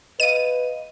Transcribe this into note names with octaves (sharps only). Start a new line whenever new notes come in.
B4 D#5 F5 D#7